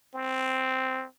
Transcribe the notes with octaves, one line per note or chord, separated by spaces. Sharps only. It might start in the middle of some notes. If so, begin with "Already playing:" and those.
C4